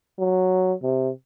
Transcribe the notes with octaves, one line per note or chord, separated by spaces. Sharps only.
F#3
C3